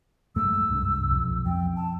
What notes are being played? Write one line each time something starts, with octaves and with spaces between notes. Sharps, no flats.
F#2 G#3 A3 E6
C2 G2
B1 F2
F2 G5
A5